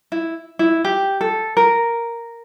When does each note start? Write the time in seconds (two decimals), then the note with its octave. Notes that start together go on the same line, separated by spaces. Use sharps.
0.12 E4
0.59 E4
0.85 G4
1.21 A4
1.57 A#4